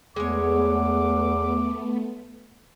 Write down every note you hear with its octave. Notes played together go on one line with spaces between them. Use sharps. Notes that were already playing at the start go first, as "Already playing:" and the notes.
E2 G#3 A3 B3 C#5 D6